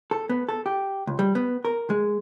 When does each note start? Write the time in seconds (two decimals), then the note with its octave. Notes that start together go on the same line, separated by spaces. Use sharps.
0.11 A4
0.29 B3
0.49 A4
0.66 G4
1.07 C#2
1.19 G3
1.35 B3
1.65 A#4
1.90 G#3